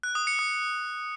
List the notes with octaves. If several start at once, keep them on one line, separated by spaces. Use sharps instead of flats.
F#6
D#6
C#7
D#6